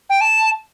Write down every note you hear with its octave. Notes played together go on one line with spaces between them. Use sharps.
G5
A5